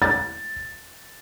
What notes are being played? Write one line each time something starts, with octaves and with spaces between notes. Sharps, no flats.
A6